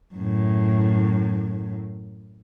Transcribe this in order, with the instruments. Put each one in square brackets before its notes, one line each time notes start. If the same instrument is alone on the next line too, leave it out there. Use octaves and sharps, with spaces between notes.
[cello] F#2 A2